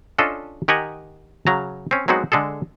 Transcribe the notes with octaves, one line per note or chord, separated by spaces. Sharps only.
C#4 D4 F4 A4 D#5
D#3 G4 D#5 F#5 G#5 A#5
C#3 F#3 A#5
C4 C#4
F#3 G#3 B3 C4 D#4 F#4
D3 G#3 G#4 A4